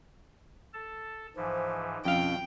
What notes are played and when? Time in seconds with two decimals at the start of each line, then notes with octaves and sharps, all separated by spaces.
0.74 A4 A5
1.36 G#2 E3 F3 C5
2.05 F2 B2 C#4 F5 G5